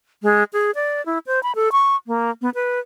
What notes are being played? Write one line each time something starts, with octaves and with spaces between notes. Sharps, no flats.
G#3
G#4
D5
E4
C5
B5
A4
C#6
A#3
B3
B4